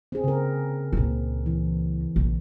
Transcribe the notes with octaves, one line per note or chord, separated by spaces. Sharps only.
C4 G#4
C#3 A#4
C#2 A#2
E3
A#1